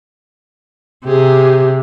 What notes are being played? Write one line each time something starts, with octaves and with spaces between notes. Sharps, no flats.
C3 G4 G#4